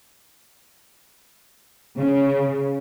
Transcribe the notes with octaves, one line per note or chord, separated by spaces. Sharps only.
C#3